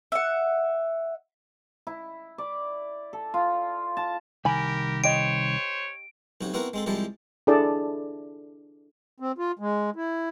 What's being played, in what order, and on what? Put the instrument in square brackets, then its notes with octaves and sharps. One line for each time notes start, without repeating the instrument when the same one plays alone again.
[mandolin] E5 F#5
[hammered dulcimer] E4
D5
A4
F4
A5
[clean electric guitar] C2 D#3 B5 [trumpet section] G4 A#4 [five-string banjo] G#5
[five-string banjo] G4 D#5 [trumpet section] C5 C#5 [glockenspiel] D7
[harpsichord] B1 C3 F#4 C#5
B3 C4 E4 F#4 A#4 F#5
G#3 C4 A4
C2 F3 G3 G#3 E4 A5
[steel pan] D4 E4 G#4 A4 D5 A5
[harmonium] C4
F4
G#3
E4